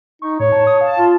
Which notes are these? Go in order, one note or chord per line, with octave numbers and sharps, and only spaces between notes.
D#4 C#6
A2 C#5
A5
D#6
F5 A5
F4